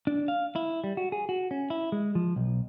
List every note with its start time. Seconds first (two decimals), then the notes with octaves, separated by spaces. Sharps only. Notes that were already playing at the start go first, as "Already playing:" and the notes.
0.07 D4
0.28 F5
0.56 E4
0.84 G3
0.97 F#4
1.12 G#4
1.29 F#4
1.51 C#4
1.70 E4
1.92 G#3
2.15 F3
2.36 B1